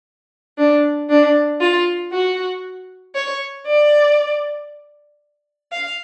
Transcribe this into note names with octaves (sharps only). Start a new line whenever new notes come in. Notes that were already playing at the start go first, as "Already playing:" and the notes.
D4
D4
F4
F#4
C#5
D5
F5